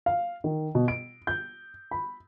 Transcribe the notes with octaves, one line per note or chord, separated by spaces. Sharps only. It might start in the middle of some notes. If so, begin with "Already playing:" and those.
F5
D#3
B2
D7
G6
B5